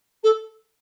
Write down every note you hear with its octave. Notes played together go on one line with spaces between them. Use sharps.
A4